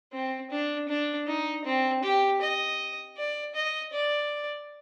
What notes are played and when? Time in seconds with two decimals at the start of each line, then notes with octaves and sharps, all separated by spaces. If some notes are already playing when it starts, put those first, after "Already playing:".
0.12 C4
0.51 D4
0.88 D4
1.27 D#4
1.65 C4
2.03 G4
2.41 D#5
3.17 D5
3.55 D#5
3.93 D5